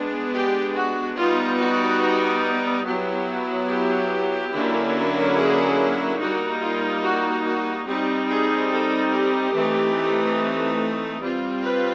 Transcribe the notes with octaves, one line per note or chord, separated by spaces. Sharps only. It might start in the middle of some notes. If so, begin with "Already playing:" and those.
Already playing: G#3 B3 D4
G4
F#4
G3 B3 D#4 F4
F#4
F#3 B3 E4 G4
G4
D3 F#3 A#3 C#4 E4
G#4
G3 A#3 D#4 F#4
F4
F#4
F#4
G3 C4 D#4 G4
G#4
A4
G4
E3 A3 C4 D#4
G3 C4 F4
B4